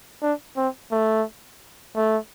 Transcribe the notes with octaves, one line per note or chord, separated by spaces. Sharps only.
D4
C4
A3
A3